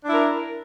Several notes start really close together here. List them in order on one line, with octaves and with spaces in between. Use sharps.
D4 E4 A#4